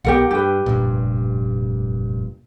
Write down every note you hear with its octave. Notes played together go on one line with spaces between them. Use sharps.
B1 G3 B3 G4 A#4 F#5
G2 G4 B4
F1 G2 A#2